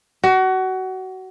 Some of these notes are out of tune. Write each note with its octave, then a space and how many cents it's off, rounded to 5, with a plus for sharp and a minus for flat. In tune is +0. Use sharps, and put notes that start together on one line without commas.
F#4 +25